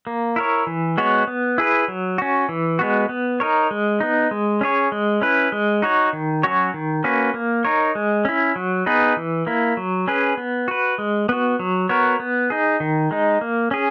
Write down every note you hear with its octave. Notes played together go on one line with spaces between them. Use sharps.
A#3
E4 A#4 C#5
E3
G#3 B3 F#4 C#5
B3
E4 G#4 B4
F#3
C#4 F#4
E3
G#3 B3 F#4
B3
D#4 A#4 C#5
G#3
B3 D#4
G#3
C#4 G#4 C#5
G#3
C#4 E4 B4
G#3
D#4 F#4 C#5
D#3
F#3 C#4 F#4 C#5
D#3
A#3 C#4 F#4 B4
A#3
D#4 A#4 C#5
G#3
C#4 E4
F#3
B3 D#4 G#4 B4
E3
A#3 E4
F#3
C#4 G#4 B4
B3
F#4 B4
G#3
B3 F#4
F#3
B3 F#4 A#4 C#5
B3
D#4 G#4
D#3
G#3 D#4
A#3
C#4 G#4